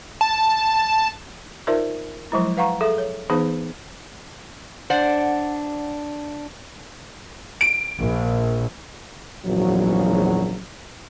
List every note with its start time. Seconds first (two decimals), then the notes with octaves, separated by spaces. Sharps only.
0.21 A5
1.67 D#4 F4 A#4 C5 D5 E5
2.32 F3 F#3 G#3 E4
2.57 B4 F5 F#5 A#5 C#6
2.81 G#4 A4 E5
2.98 C#5
3.30 E3 B3 D#4 G#4 C5
4.90 D4 C5 D5 F#5
7.61 D7
8.01 A#1
9.46 A#1 E2 G#2 C#3 F#3